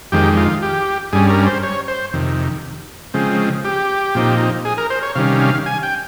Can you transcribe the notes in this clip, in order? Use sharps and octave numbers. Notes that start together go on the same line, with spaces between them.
F2 D#3 G#3 G4
F4
G4
G2 G3 C#4 G#4
A#4
C5
C#5
C5
F2 C3 D#3
C#3 F3 G#3 C4
G4
A#2 F3 C4 D#4
G#4
A#4
C5
C#5
C3 D#3 G3 C#4 F5
F5
G#5
G5